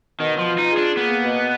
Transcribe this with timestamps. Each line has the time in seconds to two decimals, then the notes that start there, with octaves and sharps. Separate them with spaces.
0.19 B2 D#3
0.39 F3
0.45 F4
0.58 D#4
0.71 G#4
0.77 D4
0.97 A#3 B3
1.24 B2